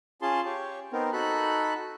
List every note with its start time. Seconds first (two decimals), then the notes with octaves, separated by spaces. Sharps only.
0.22 C#4 F4 G#4 A5 C6
0.45 G4 C#5
0.93 B3 C4 D#4 A#4
1.13 D#4 F#4 A4 B5 F#6